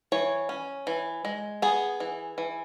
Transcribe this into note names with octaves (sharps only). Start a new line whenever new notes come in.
E3 C#5
C#4
E3
G#3
B3 G#4
E3
E3